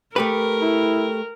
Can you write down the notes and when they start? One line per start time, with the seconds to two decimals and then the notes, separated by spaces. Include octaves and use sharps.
0.16 A3 G4 A#4 B4
0.61 E4